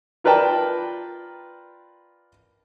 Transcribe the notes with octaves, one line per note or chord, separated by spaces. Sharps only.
F4 A#4 B4 D5 G5 A5